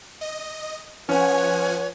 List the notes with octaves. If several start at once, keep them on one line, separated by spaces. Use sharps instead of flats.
D#5
F3 C#4 B4 C#5 F#5 G#5